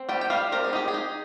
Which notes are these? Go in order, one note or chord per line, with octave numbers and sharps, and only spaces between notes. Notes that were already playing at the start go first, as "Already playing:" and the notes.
Already playing: C4
G3 G5
G5
G3 F5
C4 A#4
G#4
D#4 G4
G#4
D#4